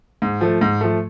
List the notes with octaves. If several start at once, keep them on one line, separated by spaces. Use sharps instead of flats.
G#2
F3 A3
G#2
F3 A3